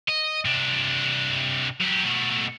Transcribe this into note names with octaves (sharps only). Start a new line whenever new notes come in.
D#5
C3 D4
F#3 G4
B2 A3